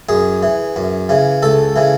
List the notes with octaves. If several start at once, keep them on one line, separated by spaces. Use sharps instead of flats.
F#2 G#4
E3
F#2
C#3 E3
C#2 A4
C#3 E3